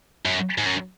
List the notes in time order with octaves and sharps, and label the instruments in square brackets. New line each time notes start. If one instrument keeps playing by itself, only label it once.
[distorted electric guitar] F#2
G#2
F#2